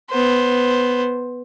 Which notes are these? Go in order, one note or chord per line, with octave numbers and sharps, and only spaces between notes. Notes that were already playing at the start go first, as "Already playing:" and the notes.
B3 C5